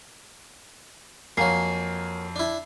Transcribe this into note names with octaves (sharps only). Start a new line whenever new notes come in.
F2 F#3 A#3 F5 G#5 A#5 C7
D4 E4